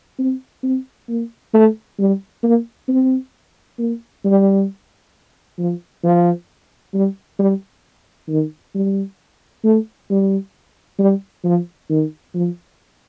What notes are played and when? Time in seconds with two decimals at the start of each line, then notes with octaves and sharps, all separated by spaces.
0.19 C4
0.63 C4
1.08 A#3
1.53 A3
1.99 G3
2.43 A#3
2.88 C4
3.79 A#3
4.24 G3
5.59 F3
6.03 F3
6.94 G3
7.39 G3
8.29 D#3
8.75 G3
9.64 A3
10.10 G3
10.99 G3
11.44 F3
11.90 D#3
12.34 F3